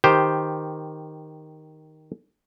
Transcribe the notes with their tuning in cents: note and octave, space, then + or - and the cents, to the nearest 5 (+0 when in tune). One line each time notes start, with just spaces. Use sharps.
D#3 +0 G4 +5 C5 -5